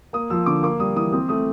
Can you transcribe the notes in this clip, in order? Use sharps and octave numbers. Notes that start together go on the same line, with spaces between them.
A#3 D#6
F3 E6
D3 D6
A#3 D6
G3 D#6
E3 D#6
C4 D#6
A3 D#6